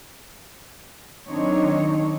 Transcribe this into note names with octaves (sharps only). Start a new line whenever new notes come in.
D#3 F#3 C4 D4 D#4 C#5